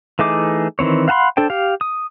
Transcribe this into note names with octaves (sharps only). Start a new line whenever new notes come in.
E3 A3 D#4 G#4 D6
D#3 E3 C4 C#5
F5 F#5 A5 B5 C6
D4 A4 C5 G5
G4 F5
D#6